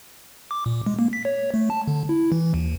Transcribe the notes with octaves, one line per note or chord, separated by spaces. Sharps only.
D6
A#2
G#3
A#3
B6
C#5
A3
A5
D3
E4
E3
D#2